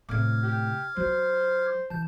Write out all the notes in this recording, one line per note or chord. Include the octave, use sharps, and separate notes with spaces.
A2 C3 D6 F6 G#6
G4
F#3 F4 C5
E3 A5 G6